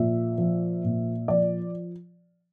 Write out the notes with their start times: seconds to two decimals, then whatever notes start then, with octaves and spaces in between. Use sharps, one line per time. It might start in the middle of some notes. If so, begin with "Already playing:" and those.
Already playing: A#2 F3 E5
0.38 F3
0.84 A#2
1.28 F3 D5